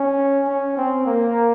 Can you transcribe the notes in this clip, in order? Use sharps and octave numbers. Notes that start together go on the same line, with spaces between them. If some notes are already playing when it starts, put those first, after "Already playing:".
Already playing: C#4
C#4
C4
A#3